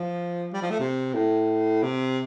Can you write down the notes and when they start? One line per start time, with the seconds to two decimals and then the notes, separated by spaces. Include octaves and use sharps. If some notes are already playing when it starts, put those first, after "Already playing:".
Already playing: F3
0.53 G3
0.62 F3
0.70 A3
0.80 C3
1.14 A2
1.83 C3